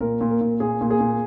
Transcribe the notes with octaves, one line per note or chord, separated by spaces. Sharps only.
A#2 A#4
A#2
A#4
A#2
A#2 G#4
A#2
G#4
A#2